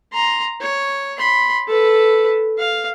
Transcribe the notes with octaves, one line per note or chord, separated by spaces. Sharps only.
A#5 C6
C#5
B5 C6
A4 B4
F5